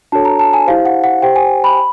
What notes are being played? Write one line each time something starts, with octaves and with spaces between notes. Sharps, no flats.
D4 F#4 A4 C#5 A5
A#5
A5
G#5
E4 G4 C5 F5
F#5
F#5
G4 C5 G5
G#5
B5